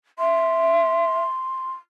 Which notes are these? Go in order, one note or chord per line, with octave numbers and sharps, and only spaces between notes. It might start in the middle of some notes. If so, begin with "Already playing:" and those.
E5 C6